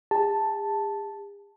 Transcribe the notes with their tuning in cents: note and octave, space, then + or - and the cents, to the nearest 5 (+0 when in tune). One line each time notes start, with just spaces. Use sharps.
G#4 -45 A5 +0